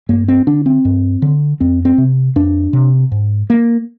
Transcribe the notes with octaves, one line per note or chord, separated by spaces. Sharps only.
G2 A#3
C4
D3 D4
C4
G2
D3
F2 C4
C4
C3
F2 D4
C3
G#2
A#3